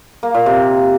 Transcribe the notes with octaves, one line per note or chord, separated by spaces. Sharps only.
A#3
A#2
C3